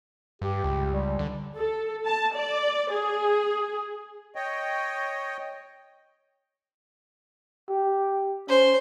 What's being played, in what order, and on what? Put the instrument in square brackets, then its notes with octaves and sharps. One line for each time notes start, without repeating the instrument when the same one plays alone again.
[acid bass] G2 [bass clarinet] G4
[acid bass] C#2
[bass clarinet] G3
[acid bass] D3
[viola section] A4
A5
D5
G#4
[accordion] C#5 D#5 G5
[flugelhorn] G4
[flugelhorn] C#4 [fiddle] C5